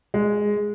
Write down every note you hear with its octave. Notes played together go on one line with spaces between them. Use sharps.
G#3